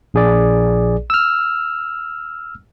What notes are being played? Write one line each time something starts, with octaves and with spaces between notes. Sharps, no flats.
A#1 G#4 D5
E6 F6